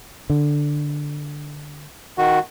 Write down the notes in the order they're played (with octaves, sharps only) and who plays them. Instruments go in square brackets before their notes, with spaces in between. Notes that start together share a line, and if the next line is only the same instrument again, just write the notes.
[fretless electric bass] D3
[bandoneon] D#3 F#4